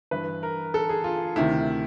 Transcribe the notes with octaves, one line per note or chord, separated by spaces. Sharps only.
G2 E3 B4
A#4
A4
G#4
F4
D2 C3 D#3 E4